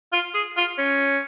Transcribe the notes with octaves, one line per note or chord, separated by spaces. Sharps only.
F4
G#4
F4
C#4